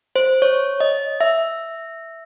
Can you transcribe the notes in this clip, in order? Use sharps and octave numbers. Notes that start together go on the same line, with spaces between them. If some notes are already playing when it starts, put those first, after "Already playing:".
C5
C#5
D#5
E5